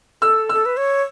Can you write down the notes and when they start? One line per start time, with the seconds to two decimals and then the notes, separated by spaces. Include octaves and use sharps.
0.22 A4 E6
0.49 A4 E6
0.66 B4
0.77 C#5